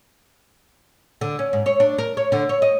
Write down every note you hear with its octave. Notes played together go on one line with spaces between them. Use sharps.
D3
C#4
G#2
C#5
D4
A#4
C#5
D3
C#5
D#5